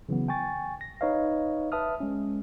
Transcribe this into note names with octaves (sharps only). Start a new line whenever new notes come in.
C#3 E3 F#3 B3
G5 G#5 C#6 A6
A#6
D#4 B4 C#5 D#5 F5
B4 E5 A5 D#6 F6
G#3 C#4